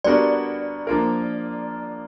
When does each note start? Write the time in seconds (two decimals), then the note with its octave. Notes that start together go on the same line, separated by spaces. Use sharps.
0.04 G3 B3 D4 F#4 A#4 D5
0.87 F3 A#3 D4 F4 A#4